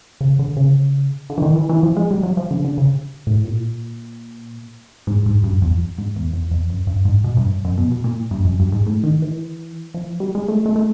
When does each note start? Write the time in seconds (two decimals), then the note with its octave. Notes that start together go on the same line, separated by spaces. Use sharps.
0.21 C#3
0.39 D3
0.57 C#3
1.30 D3
1.38 E3
1.42 D#3
1.56 E3
1.69 E3
1.83 F3
1.97 G#3
2.11 G3
2.23 F#3
2.37 F3
2.51 D3
2.65 D3
2.78 C#3
3.27 A2
3.45 A#2
5.07 G#2
5.26 G#2
5.44 G2
5.62 F2
5.98 G#2
6.16 E2
6.33 F2
6.51 F2
6.70 F#2
6.87 G2
7.05 G#2
7.24 B2
7.37 G2
7.65 F#2
7.77 B2
7.91 B2
8.04 A#2
8.31 G2
8.45 F#2
8.59 G2
8.72 G#2
8.86 A2
9.03 D#3
9.22 E3
9.94 F3
10.20 G3
10.35 G#3
10.48 A3
10.66 A3
10.76 A3